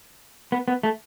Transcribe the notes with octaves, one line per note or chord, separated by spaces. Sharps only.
B3
B3
A3